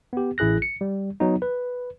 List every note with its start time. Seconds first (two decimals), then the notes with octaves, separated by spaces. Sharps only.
0.13 B3 G4
0.38 A1 E4 G#4 F#6 A#6
0.62 C#7
0.81 G3
1.20 F#3 B3 D#4
1.42 B4